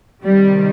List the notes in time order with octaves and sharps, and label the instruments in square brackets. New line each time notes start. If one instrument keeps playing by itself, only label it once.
[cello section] C3 D#3 G3